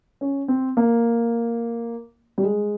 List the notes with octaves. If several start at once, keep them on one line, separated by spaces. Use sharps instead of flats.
C#4
C4
A#3
G3
G#3